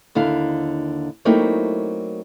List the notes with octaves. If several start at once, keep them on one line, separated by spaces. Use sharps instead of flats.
D#2 D3 E4 F5
F#3 A3 A#3 C4 D#4 E4